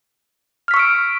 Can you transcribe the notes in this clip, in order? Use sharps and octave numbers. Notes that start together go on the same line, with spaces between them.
C#6 E6 F6 B6 D7